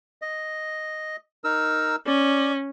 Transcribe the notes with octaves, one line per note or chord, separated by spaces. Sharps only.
D#5
D#4 A#4 E6
C#4 D5